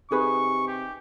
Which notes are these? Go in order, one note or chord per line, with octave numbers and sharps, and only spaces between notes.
C3 D#4 G#4 B4 C#6
G4